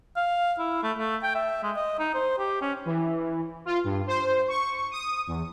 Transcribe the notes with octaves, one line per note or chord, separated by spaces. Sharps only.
F5
E4
A3
A3
G5
E5
G#3
D#5
D#4
C5
G4
C#4
E3
F4
G2
C5
C#6
D#6
E2